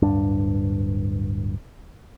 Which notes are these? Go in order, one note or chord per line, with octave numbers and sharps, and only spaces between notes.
D1 G2 D4